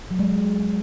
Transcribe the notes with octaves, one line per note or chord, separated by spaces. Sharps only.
F#3
G#3